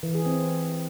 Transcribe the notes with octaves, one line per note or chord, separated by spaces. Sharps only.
E3
G#4
C4